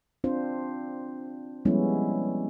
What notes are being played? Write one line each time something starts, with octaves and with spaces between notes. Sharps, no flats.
C4 D4 F4 C5
F3 G3 G#3 B3 C#4 E4